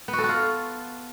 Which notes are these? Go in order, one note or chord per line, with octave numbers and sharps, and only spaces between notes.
B3
F#4
A4
F#4
F4